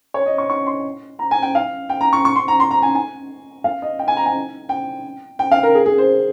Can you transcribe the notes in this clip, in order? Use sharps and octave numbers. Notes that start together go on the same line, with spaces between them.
C#5
D#5
C#6
C#6
C6
A#5
G#5
G5
F5
G5
A#5
C#6
C#6
C6
A#5
C6
A#5
G#5
G#5
F5
D#5
G5
G#5
A#5
G#5
G5
G5
F5
A#4
G#4
G#4
C5